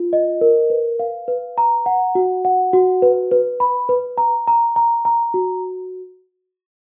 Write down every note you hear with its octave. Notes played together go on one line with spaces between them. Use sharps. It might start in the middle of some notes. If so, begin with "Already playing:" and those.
Already playing: F4
D#5
A#4
B4
F5
B4
A#5
F#5
F#4
F#5
F#4
B4
B4
B5
B4
A#5
A#5
A#5
A#5
F#4